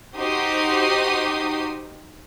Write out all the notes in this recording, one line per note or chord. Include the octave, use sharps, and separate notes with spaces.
D#4 F#4 G4 C5 D#6 C7